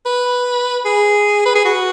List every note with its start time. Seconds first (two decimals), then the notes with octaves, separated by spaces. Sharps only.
0.06 B4
0.85 G#4
1.45 B4
1.55 G#4
1.65 F#4